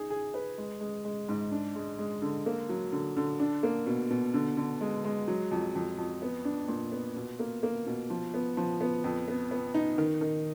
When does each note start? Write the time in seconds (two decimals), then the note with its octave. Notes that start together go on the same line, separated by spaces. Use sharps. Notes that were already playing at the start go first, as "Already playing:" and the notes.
Already playing: D#4 G#4
0.10 G#4
0.34 B4
0.58 G#3
0.80 G#3
1.05 G#3
1.29 G#2
1.51 D4
1.75 G#3
1.98 G#3
2.22 D3
2.46 A#3
2.69 F#3
2.92 D3
3.17 D3
3.40 D4
3.63 A#3
3.86 B2
4.10 B2
4.34 D3
4.57 D3
4.81 G#3
5.04 G#3
5.28 F#3
5.51 F2
5.75 F2
5.98 F2
6.22 B3
6.45 D4
6.68 A#2
6.92 B3
7.16 B2
7.39 A#3
7.63 A#3
7.87 B2
8.10 F3
8.34 B3
8.57 F3
8.81 B3
9.04 F2
9.28 B3
9.51 B3
9.74 D#4
9.98 D#3
10.21 D#3